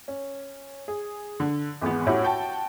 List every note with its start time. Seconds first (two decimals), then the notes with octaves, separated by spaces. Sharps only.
0.08 C#4
0.88 G#4
1.40 D3
1.81 G#1 E2 G#3 B3
2.07 A2 C#4 E4 F#4 G4
2.23 F#4 G5 A5